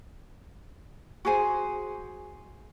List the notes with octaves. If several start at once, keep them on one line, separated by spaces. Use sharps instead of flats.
F#4 G#4 C5 G#5